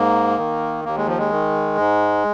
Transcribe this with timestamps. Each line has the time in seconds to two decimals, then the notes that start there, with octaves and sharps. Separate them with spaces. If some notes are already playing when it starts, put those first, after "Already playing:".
Already playing: G#2 A#3
0.38 D#3
0.85 D#2 A#3
0.96 G#3
1.07 F3
1.18 G#3
1.31 D#3
1.77 G#2